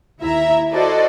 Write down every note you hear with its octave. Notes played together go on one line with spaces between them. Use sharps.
D#2 E4 E5 A#5
E4 F#4 A4 C5 D5 D#5